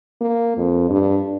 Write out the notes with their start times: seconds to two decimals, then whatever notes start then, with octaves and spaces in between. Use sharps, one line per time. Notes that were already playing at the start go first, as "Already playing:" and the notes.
0.21 A#3
0.57 F2
0.90 G2